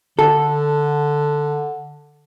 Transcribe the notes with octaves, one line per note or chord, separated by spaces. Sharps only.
D3 A4